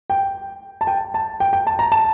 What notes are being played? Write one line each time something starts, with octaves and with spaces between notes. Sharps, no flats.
G5
A5
G5
A5
G5
G5
A5
A#5
A5